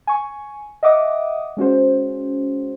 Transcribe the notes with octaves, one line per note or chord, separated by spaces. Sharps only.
G#5 C#6
D#5 E5 F#5 D6 D#6
G#3 C#4 F#4 C5